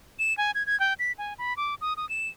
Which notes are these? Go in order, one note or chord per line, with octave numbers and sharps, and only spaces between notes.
E7
G#5
G#6
G#6
G5
B6
G#5
B5
D6
D#6
D#6
E7